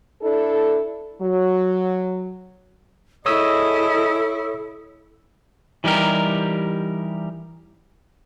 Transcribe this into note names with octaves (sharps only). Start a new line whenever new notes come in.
D4 E4 A4
F#3
E4 G#4 A4 C#5 D#5 D#6 E6
E3 G3 D#4 G4 A#4